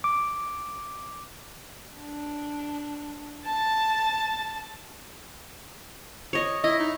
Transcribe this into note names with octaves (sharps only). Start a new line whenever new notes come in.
D6
D4
A5 A6
C#5 D#5
E4 D#5
D#4